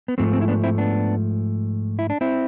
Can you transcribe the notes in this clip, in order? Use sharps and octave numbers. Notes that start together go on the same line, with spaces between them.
B3
G#2 F3 A3 C4
C4
E4
B3 D4
C4 E4
B3 D4
E4
D4
C4 E4